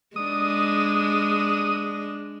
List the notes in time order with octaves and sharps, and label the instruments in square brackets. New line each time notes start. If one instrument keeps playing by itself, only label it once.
[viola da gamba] G#3 D4 [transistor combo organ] D#6